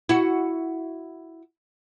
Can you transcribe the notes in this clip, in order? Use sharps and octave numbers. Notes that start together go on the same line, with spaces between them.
E4 F#4